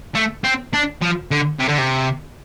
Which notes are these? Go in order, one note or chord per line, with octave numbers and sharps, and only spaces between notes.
A3
C4
D4
F3
D3
C3
D3
C3